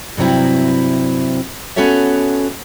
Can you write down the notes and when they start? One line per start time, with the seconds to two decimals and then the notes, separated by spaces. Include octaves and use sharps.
0.17 G2 C3 F#3 C4 E4
1.76 B3 C#4 F#4 A4 C#5 E5